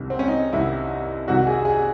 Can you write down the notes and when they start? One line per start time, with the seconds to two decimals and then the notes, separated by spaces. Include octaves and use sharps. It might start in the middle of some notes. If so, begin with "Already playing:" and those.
Already playing: C2 C3 D#3
0.10 C4
0.19 C#4
0.28 D#4
0.53 C2 C3 D#3 E4
1.28 C2 C3 D#3 F#4
1.47 G#4
1.65 G#4